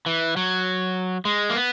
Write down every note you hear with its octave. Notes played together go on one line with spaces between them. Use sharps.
E3
F#3
G#3
A#3
B3